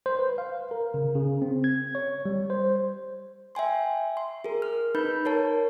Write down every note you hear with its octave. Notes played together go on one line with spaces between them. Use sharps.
C5
B4
F5
A#4
C#3
C#3
C4
G#6
C#5
G3
C5
E5 G5 G#5 C6
C6
G#4 A#4
F6
D#4 B4 B5 G6
A#4 C#5 A5